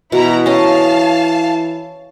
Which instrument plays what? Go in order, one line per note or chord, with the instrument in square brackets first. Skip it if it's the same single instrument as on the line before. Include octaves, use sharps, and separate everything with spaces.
[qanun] B2 [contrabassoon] E3 [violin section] E4 A#5
[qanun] C#4 D#5 [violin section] F5 A5